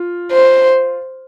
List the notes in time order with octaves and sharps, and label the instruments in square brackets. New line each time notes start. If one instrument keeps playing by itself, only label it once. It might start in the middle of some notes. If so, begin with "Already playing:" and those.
Already playing: [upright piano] F4
[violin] C5